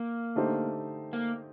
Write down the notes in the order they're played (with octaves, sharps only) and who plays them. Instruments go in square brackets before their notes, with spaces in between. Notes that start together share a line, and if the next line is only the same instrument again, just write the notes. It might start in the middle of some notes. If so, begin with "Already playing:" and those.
Already playing: [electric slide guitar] A#3
[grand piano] D3 A3 D#4 G4 C5
[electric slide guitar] A#3